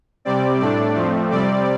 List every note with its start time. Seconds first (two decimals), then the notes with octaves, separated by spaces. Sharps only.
0.25 C3 G3 C4 D5
0.60 A2 A3 D4 D5
0.95 F2 F3 A3 C4
1.30 C3 G3 C4 D5